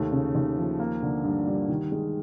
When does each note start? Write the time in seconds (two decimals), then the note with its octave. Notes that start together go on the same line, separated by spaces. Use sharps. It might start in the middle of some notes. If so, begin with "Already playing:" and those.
Already playing: D#2 A3
0.12 C#3
0.35 D#2
0.57 F3
0.80 A#3
1.02 D3
1.24 G2
1.47 G3
1.69 D#3
1.92 G#3